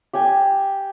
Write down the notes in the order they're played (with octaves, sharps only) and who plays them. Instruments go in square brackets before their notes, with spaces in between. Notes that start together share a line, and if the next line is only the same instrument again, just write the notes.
[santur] G4 G5 G#5